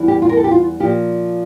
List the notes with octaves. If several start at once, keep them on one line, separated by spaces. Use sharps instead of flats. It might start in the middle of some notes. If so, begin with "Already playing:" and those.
Already playing: E2 E3 G3
G4
F4
A#4
A4
G4
F4
A#2 F3 G4